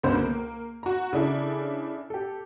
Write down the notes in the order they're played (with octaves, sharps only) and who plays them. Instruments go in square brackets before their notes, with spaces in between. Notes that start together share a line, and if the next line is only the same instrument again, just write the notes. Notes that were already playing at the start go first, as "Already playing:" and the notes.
[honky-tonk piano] C#2 B2 D3 C5 B5
A#3
F#4 A#5
C#3 D4 E4 A4
G4 A4